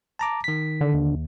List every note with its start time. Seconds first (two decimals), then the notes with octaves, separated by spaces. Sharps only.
0.19 A5 A#5 D6
0.44 D#3 B6
0.81 D3
0.94 D#2